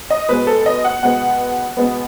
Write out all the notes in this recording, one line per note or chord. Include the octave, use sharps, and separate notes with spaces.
D#5
B2 G#3 B3 B4
A4
D#5
F#5
B2 G#3 B3 F#5
B2 G#3 B3